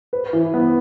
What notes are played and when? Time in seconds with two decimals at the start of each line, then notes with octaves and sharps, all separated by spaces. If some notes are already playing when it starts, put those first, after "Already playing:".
0.13 B4
0.33 E3
0.54 B3